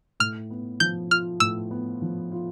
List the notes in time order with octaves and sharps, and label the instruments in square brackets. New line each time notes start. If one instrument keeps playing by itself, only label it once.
[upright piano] A2 [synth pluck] F6
[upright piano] B3
[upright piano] F3 [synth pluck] G6
[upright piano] F4 [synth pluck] F6
[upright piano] A2 [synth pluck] E6
[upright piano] B3
F3
F4